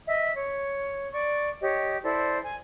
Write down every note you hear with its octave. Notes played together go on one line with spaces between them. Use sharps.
D#5 E5
C#5
D5 C#6
G4 C#5 D#5
E4 A4 C5 D5
G#5